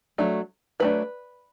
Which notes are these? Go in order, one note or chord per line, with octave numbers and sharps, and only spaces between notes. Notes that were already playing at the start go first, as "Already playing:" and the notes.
F#3 A3 D4
F#3 A3 D4 B4